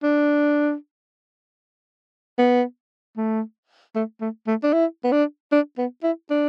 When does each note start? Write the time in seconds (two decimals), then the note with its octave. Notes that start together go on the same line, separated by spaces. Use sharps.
0.03 D4
2.38 B3
3.17 A3
3.95 A3
4.21 A3
4.47 A3
4.63 D4
4.73 E4
5.04 B3
5.12 D4
5.52 D4
5.78 B3
6.03 E4
6.31 D4